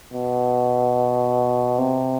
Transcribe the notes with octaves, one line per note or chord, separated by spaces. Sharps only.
B2
C3